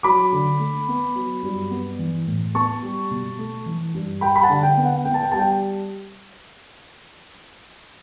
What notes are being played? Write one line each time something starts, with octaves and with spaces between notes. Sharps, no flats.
F#3 B5 D6
D3
A3
B3
F#3
G2
B3
E3
A2
B3 A5 C#6
G3
B2
A3
E3
G2
G3 G5 B5
B5
F#5 A5
D3
G5
B3
F#5
B3 G5
A5
G5
G3 A5
G5